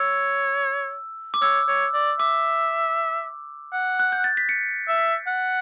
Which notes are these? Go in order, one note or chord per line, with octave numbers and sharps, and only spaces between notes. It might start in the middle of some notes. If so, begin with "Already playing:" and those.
Already playing: C#5 E6
D6
C#5 E6
C#5
D5
E5 D6
F#5
F#6
G6
A6
B6
C#7
E5
F#5